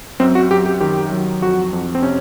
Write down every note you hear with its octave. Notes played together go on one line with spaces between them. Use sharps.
F#2 C4
F#4
F#2 G4
G4
D#3 G4
F#3
F2 F#4
F2
C4
C3 C#4